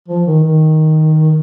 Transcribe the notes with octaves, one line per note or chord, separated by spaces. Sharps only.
F3
D#3
D#3